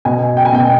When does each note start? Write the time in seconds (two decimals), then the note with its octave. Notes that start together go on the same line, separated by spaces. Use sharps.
0.05 B2 G#5
0.37 G5
0.45 G#5
0.53 B2 G5